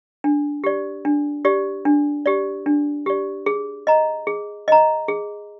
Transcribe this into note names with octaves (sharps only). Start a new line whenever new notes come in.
D4
G4 D5
D4
G4 D5
D4
G4 D5
D4
G4 D5
G#4
D#5 A#5
G#4
D#5 A#5
G#4